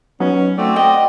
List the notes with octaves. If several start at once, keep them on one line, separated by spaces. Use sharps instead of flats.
F#3 B3 C#4 D#4
A3 C4 F#4 D5
D#5 G5